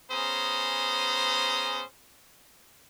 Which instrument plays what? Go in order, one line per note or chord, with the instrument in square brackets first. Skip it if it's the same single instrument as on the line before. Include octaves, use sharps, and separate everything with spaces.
[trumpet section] B3 C#4 G#4 C5 A#5 D#6